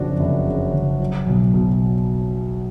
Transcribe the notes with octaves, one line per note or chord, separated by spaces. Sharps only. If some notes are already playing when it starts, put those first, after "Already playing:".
Already playing: F#1 F2 C#3 D4 F#4
F#1
C#3
F#1
F#3
B1
B2